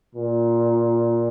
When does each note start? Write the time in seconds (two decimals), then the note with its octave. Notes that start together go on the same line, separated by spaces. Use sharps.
0.15 A#2